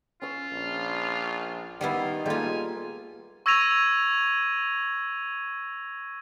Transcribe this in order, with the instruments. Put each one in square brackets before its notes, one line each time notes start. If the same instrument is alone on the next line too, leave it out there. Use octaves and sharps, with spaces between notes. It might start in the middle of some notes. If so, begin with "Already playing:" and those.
[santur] C#4 E6 [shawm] F4
[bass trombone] A#1
[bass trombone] D#3 [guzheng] G3 B3 E4 [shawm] F4
[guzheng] G3 F4 [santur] G#3 A#3 A4 [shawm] G#5
[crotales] C#6 E6 G#6 A#6 D#7 F7